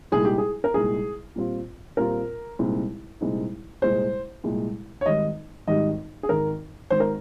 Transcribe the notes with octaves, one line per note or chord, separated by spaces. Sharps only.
C2 A#2 G#3 D#4 G#4
G4
G#4
A#4
C2 A#2 G#3 D#4 G#4
A#2 G3 C4 F4
A#2 G3 C4 F4 A#4
C2 A#2 G#3 C4 D#4
C2 A#2 G#3 C4 D#4
C2 A#2 G#3 C5
C2 A#2 G#3
C#5
G#1 G#2 D#3 G3 D#5
G#1 G#2 D#3 G3 D#5
G#4
G#1 G#2 D#3 A#4
G#1 G#2 D#3 C5
A#4